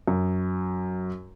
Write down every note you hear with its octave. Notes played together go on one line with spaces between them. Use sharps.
F#2